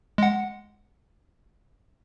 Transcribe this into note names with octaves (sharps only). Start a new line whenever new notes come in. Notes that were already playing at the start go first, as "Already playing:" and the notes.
G#3 F#5